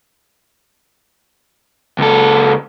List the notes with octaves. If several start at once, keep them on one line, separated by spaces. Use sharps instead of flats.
C#2 A4